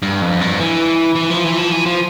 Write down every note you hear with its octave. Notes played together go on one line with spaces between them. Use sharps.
G2
F2
G2
E3
E3
F3
E3
F3
E3
F3